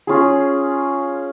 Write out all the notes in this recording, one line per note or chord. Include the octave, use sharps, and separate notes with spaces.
C#4 F4 G#4